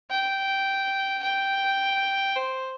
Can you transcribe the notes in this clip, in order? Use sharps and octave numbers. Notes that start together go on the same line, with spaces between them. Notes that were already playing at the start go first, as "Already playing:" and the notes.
G5
G5
C5